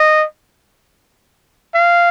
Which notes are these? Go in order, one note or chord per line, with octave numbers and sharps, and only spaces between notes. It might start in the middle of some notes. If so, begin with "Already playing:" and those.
Already playing: D#5
F5